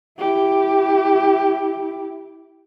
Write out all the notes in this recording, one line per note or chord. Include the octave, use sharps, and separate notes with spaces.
E4 G4